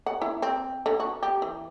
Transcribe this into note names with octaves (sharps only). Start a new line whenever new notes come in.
F#5
E4
C4
D3
F#4
G4
E3